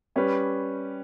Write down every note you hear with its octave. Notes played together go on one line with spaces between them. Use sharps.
G3 C#4 G4 B4